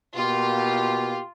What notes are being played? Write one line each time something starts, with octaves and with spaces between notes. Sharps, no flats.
B2 A#3 F4 G4